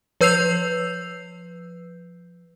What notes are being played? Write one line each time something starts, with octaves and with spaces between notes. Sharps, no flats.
F3 B4 E6 G6 C7 F7